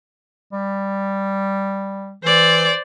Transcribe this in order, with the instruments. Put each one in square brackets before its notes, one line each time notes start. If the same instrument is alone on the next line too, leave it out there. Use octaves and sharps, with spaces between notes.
[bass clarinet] G3
[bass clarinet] E3 [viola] C5 D5